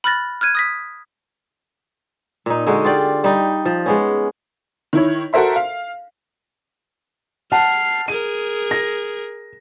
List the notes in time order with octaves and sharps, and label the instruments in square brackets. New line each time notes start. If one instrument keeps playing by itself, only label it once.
[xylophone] B5 F6 F#6 A6 A#6
F6 F#6 G#6 D#7
D#6 A#6 B6
[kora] A#2 D#4
D3 G#3 D#4 F#4
F4 G4 D5 F5
G3 D#4
F3
G#3 B3 C#4
[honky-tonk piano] D#3 E4 C#5
F#4 A4 A#4 C5 E5 C6
F5
[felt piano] F#5 A5 [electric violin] F6 C7
[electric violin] G#4 A#4 [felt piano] D#7
[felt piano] A#6